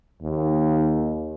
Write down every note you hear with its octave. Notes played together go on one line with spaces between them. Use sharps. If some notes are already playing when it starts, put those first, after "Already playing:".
D#2